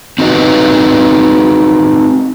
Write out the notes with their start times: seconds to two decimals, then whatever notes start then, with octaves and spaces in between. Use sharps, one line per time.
0.18 C4 D4 D#4 F#4 B4 D#5